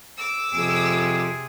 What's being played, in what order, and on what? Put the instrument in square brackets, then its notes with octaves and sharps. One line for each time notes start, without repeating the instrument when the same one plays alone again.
[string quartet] D6 E6
[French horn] F2 [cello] C3 G#4